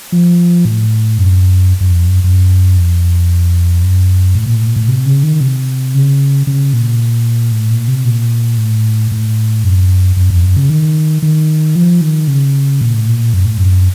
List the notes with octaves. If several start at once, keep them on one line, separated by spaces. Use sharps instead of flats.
F3
A2
F#2
F#2
F2
F#2
F#2
F2
F#2
A2
A#2
A2
A#2
A2
C3
C#3
D#3
C3
C#3
C#3
A#2
A2
A#2
C3
A#2
A2
A2
F#2
F#2
F2
F#2
C#3
D#3
D#3
F3
D#3
C#3
A#2
A2
A#2
F#2
A2
F#2